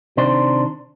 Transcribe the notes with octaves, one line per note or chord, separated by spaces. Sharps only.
C3 D#3 D4 C5